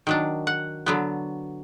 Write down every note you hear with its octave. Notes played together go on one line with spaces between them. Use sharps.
D#3 F#3 D4
F#5
D3 F#3 B3